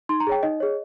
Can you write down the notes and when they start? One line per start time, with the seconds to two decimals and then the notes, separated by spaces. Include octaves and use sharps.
0.09 D#4 C6
0.20 A#5
0.27 G#4 C#5 G5
0.43 D#4 D#5
0.60 G#4 C#5